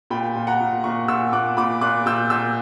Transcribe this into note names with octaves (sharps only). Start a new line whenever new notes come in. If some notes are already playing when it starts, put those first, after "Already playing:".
A#2 G5 B5
A#2
F#5 A#5
A#2
A#2 A#5 C#6
A#2 C#6 E6
A#2 D6 F#6
A#2 B5 D6
A#2 D6 F#6
A#2 E6 G6
A#2 E6 G6